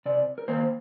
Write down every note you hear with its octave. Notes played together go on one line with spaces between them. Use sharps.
C3 D5
A#4
D#3 A#3 C5